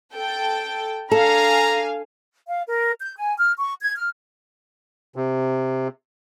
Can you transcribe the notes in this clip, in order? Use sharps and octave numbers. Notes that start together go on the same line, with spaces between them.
A4 G5
D4 A4 F5 G#5 A#5
F5
A#4
G6
G#5
F6
C#6
G#6
F6
C3